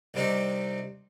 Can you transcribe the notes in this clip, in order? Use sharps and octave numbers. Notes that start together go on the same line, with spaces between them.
C2 C3 G3 C4 D#4